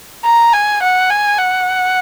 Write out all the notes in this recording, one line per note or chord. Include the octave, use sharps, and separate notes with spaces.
A#5
G#5
F#5
G#5
F#5